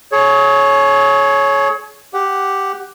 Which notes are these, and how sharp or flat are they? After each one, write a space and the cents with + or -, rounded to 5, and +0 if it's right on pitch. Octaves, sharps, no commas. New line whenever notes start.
G#4 +40 C#5 +0
G4 +0 F#5 +15